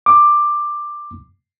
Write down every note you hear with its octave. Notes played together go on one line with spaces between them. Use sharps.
D6